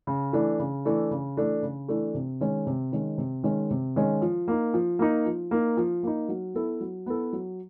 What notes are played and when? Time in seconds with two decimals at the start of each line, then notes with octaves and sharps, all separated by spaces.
0.07 C#3
0.33 E3 A3 D4
0.59 C#3
0.85 E3 A3 D4
1.11 C#3
1.37 E3 A3 D4
1.63 C#3
1.88 E3 A3 D4
2.14 C3
2.41 D#3 G#3 C#4
2.67 C3
2.92 D#3 G#3 C#4
3.18 C3
3.43 D#3 G#3 C#4
3.70 C3
3.96 D#3 G#3 C#4
4.22 F3
4.48 A#3 D#4
4.74 F3
4.99 A#3 D#4
5.26 F3
5.51 A#3 D#4
5.77 F3
6.03 A#3 D#4
6.29 F#3
6.54 B3 E4 A4
6.80 F#3
7.06 B3 E4 A4
7.33 F#3